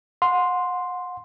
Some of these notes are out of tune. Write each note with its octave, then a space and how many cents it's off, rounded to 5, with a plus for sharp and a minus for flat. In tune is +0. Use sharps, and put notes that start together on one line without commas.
F#5 -35 C6 +0